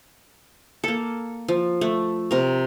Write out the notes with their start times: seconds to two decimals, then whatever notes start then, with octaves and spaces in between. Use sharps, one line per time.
0.84 A#3 A4
1.48 F3
1.81 A3
2.31 C3 A#4